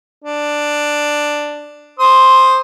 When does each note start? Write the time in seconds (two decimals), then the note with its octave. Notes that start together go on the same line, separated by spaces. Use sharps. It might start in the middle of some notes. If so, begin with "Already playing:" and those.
0.24 D4
1.99 C5 C6 D#6